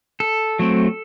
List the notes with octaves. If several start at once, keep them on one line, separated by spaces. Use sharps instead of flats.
A4
F#3 A3 C4